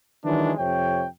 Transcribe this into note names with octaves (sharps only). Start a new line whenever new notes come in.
D#3 E3 F#3 G#3 D4
F2 C3 C#5 G5